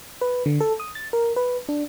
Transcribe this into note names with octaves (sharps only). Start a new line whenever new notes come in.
B4
D3
A4
D#6
A6
A#4
B4
D4